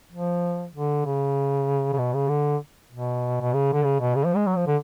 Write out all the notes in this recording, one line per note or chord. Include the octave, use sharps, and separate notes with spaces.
F3
D3
C#3
C#3
B2
C#3
D3
B2
B2
C#3
D3
C#3
B2
C#3
F3
G#3
F#3
F3
D3